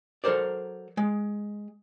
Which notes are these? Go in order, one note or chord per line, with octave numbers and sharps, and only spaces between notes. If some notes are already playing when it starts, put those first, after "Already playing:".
F#3 A4 A#4 C5 D5
G#3